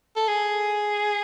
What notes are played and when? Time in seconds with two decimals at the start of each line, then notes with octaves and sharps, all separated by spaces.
0.16 A4
0.28 G#4